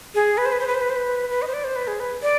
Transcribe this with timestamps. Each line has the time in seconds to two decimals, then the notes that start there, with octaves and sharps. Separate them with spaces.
0.15 G#4
0.38 B4
0.46 C5
0.52 B4
0.60 C5
0.67 B4
0.75 C5
0.81 B4
0.90 C5
0.96 B4
1.30 B4
1.42 D#5
1.47 C5
1.54 D5
1.64 C5
1.76 B4
1.87 G#4
2.00 B4
2.22 D5